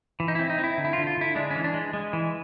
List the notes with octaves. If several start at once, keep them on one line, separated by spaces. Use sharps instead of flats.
E3
D#4
C4 E4
D#4
C4
E4
D3
E4
F4
D3
F4
D3 E4
G#3 D4
E3 C#4
D4
G#3
G#3
E3